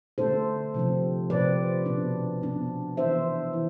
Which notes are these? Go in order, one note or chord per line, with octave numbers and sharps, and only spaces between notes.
D3 A3 D4 A4 C5
C3 F3 C4
C3 F3 C4 B4 D5
B2 B3 D4
B2 B3 D4
E3 B3 D4 C5 E5
E3